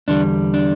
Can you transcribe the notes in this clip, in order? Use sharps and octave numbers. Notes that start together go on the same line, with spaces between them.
E2 D3 G3 D4
D4